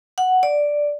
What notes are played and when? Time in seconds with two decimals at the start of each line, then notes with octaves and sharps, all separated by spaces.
0.18 F#5
0.43 D5